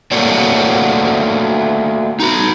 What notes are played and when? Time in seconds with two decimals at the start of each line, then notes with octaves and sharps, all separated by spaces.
0.12 A3 A#3 F#4 C#5 D5
2.20 D#4 F#4